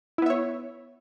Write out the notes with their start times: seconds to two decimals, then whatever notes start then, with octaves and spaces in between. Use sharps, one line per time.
0.18 E4
0.22 B3
0.26 E5
0.30 C#5